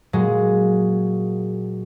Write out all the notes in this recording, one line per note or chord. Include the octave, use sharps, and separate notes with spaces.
A#2 F#3 G#3